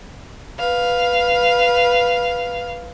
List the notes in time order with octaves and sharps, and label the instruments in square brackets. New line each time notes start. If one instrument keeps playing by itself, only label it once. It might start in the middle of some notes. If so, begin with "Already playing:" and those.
[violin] B4 F5